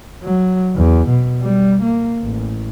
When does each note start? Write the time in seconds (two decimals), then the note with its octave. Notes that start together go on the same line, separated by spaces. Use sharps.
0.22 F#3
0.76 E2
1.08 B2
1.42 G3
1.82 A#3
2.22 A1